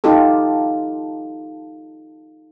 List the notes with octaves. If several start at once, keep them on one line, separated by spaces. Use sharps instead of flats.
D#4 F4 G4 A4